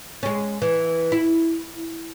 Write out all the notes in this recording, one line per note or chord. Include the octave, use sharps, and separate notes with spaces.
G#3 C#4
E3
E4